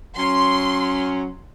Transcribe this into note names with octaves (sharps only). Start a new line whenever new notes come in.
F#3 C#4 C6